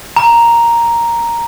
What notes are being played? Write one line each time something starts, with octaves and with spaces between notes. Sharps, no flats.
A#5